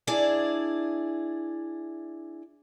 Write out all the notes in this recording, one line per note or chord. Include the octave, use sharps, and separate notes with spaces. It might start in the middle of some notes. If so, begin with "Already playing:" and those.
D4 E4 G#4 D5